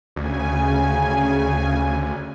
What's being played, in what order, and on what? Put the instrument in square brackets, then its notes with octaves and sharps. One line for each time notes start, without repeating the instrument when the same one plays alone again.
[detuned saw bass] D2 [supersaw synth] C#3 G#5